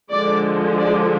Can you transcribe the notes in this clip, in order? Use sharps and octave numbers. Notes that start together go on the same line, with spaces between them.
D3 F3 G#3 D5
D5